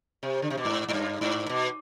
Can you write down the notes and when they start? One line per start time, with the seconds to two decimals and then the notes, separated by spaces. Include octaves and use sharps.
0.23 C3
0.42 D3
0.50 C3
0.58 B2
0.65 G#2
0.89 G#2
0.93 G2
1.21 G#2
1.49 B2